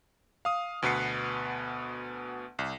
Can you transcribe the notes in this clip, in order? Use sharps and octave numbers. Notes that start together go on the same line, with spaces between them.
F5 D#6
D2 B2 B3 B4 C7 C#7
C2